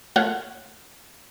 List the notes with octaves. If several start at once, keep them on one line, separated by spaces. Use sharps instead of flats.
A3 A#3 F4 C#5 F5 F#5